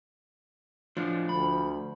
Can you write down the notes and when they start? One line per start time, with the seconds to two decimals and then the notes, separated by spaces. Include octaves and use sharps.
0.97 A2 F3 D4
1.29 D2 B5